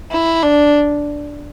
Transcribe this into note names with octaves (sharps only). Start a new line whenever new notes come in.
E4
D4